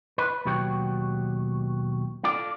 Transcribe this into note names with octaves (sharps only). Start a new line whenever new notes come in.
B4
D#2 B2 F#3 F#4 G4 C#5
F4 A4 D5